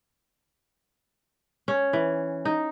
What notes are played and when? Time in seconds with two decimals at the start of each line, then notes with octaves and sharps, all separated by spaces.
1.68 C#4
1.93 E3
2.45 D#4